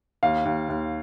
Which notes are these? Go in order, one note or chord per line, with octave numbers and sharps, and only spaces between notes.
D#2 F5
D#2
D#2